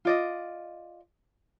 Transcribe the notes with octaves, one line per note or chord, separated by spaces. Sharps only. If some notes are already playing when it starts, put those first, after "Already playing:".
F4 D5 D#5